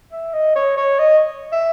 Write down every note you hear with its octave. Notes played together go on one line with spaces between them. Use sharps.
E5
D#5
C#5
C#5
D#5
E5